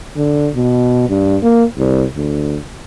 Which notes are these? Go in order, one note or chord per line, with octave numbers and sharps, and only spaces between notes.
D3
B2
G2
A#3
C2
D2